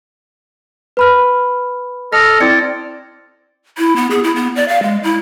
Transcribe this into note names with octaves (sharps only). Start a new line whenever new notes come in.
B4 B5 F6
A4 D#5 F6 A#6
C4 E4 D5 G#6 C#7
E4
B3
G#4
E4
B3
D5
F5
G#3
E4